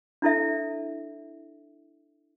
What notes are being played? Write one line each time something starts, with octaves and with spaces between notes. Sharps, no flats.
D4 E4 A4 E5